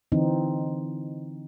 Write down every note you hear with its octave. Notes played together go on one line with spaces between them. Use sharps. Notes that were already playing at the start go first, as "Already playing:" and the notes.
D3 E3 C4 D#4